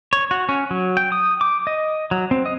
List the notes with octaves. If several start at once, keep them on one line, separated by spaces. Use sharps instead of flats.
C#5
F#4
C#4
F#3
G5
D#6
D6
D#5
F#3
C4
D#5